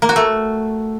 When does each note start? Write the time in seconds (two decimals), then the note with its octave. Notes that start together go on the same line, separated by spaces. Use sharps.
0.02 A#3
0.09 F#4
0.16 A3